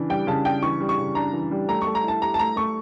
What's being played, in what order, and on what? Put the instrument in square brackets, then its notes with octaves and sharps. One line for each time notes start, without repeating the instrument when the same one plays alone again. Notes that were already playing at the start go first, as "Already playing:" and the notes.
Already playing: [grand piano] C#3 E3 D4
[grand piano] G3 [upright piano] G5
[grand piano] C#3 [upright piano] A5
[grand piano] D4 [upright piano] G5
[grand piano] E3 [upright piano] C#6
[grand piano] G3
[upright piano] C#6
[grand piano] C#3
[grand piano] D4 [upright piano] A#5
[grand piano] E3
G3
[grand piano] A3 [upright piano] A#5
[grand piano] A3 [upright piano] C#6
[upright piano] A#5
[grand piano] E4 [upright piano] A5
[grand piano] G4 [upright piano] A#5
[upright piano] A5
[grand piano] A3 [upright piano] A#5
[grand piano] A3 [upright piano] C#6